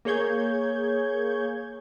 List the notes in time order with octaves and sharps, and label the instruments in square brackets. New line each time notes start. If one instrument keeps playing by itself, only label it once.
[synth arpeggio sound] A#3 G#4 C#5 G6 G#6